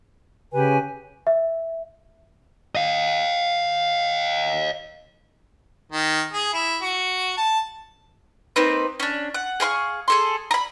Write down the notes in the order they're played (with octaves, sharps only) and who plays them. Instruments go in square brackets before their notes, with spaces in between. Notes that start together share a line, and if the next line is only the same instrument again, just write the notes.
[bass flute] C#3 [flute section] G4 B4 G#5
[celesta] E5
[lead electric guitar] D#5 F5
[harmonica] D#3
G#4
E4
F#4
A5
[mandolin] A#3 C4 D#4 B4
C#4 D4
F#5
G#4 F5 B5 C#6
G#4 A4 C6
A#5 B5